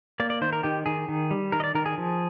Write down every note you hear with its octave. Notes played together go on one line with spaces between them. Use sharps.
A#3 D5
D5
D#3 C5
A#4
D#3 G4
D#3 G#4
D#3
G3
D#3 A#4
D#5
D5
D#3 A#4
G#4
F3